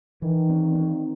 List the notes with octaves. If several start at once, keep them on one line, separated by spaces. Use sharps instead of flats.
D#3 E3
C4
C4